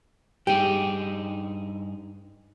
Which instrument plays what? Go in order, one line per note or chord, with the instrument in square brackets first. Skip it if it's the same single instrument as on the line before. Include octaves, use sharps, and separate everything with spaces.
[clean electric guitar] G2 D#4 G#4 [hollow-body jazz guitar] G4